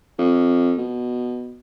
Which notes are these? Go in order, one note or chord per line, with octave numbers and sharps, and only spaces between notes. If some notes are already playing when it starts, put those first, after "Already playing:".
F2
B2